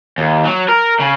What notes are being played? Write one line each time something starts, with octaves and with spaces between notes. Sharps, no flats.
D#2
F#3
A#4
C#3